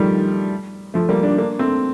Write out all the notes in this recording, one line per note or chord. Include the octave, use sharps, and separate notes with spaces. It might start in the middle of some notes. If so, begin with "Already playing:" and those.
Already playing: D#3 F3 G3 A3
F3 A3
G3 A#3
A#3 D4
A#3 D4
A3 C4